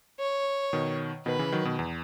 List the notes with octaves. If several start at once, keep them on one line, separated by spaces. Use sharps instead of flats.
C#5
B2 D#3
B2 D#3 B4
C#3 E3
D#3 F#3
B2 D#3
E2